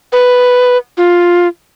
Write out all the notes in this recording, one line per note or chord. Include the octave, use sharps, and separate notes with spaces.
B4
F4